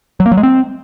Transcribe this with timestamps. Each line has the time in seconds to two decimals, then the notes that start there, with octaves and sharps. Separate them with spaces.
0.20 F#3
0.26 A#3
0.32 F#3
0.37 G#3
0.43 C4